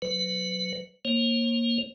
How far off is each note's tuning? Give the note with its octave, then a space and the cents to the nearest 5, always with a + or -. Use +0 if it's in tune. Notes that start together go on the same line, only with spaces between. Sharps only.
F#3 +0 B4 +30
A#3 +10 C#5 -45